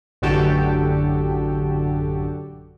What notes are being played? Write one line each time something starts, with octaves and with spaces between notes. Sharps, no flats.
A1 F#2 D3 F#4 G4 A4